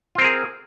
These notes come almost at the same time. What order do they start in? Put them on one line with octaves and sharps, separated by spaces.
F4 C4 A#4 G#4